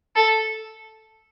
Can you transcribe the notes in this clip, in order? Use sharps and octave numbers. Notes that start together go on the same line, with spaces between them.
A4